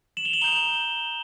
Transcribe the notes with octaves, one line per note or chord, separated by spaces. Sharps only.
E7 F#7
F7 G7
E7 F#7
A#5 D#6 G6 F7 G7
G7